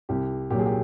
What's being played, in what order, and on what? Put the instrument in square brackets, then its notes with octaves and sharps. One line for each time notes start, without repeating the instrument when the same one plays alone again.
[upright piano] C2 G4
A#2 G4
F#3 G#4
G4